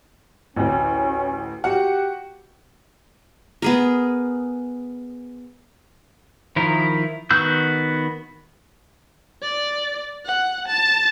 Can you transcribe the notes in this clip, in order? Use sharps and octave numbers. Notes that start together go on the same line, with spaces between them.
A1 D2 C#4
F#4 G4 F#5
B3 G#4 A#4
D#3 F3 E4 A#4
D#3 B3 F#4 E6 G6
D5
F#5
A5